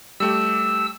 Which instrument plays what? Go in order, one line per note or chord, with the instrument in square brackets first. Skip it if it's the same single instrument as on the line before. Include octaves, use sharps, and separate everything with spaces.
[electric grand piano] G3 A3 G4 [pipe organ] E6